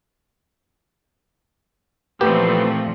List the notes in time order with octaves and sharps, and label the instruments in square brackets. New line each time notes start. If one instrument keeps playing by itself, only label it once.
[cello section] A#2 E3 F3 [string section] A3 C4 [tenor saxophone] B3 [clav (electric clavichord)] G4